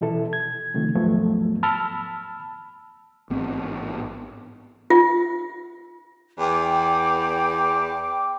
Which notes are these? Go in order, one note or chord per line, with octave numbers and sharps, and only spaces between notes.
B2 E3 E4 A4
G#6
C3 D#3 F3 A3
D#2 G#2 F3 F#3 A3 B3
A5 B5 E6 F6
A1 G#2 B3 C4
F4
E2 G5 D6